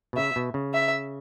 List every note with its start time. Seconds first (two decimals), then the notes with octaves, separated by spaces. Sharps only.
0.13 B2
0.17 C#3 E5
0.36 B2
0.54 C#3
0.74 E5